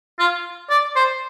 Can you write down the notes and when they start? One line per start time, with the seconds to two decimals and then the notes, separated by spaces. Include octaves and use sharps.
0.19 F4
0.70 D5
0.96 C5